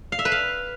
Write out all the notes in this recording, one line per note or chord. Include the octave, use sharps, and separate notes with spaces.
F5
E5
B4
F5